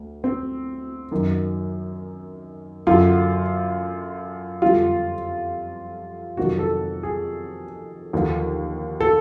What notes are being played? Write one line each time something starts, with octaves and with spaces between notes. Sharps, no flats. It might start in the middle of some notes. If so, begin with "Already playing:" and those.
Already playing: D2
C4
F#2 D#3 F#3
F#2 D3 F#3 F4
F2 D3 G3 F4
F2 C3 D#3 F#3 F#4
A4
G#4
D#2 D3 F3
A4